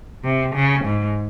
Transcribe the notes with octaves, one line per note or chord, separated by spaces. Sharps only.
C3
C#3
G#2